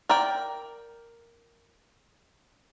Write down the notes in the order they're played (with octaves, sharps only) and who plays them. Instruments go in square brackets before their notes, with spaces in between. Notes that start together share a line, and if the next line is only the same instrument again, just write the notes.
[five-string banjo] A#4 D5 G5